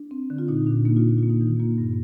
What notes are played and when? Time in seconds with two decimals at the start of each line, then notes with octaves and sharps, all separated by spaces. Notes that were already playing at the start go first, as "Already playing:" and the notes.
Already playing: D4
0.11 C4
0.30 D3
0.38 F4
0.48 A#2 D#4
0.67 A#2 D4
0.85 A#3 D#4
0.97 F4
1.04 A#2 D#4
1.18 A#3 F4
1.30 D#4
1.41 D#3
1.60 A#3 F4
1.78 G2